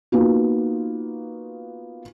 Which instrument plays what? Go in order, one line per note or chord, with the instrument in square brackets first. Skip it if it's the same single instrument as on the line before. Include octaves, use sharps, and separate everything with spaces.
[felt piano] A#3 B3 D#4 F4 F#4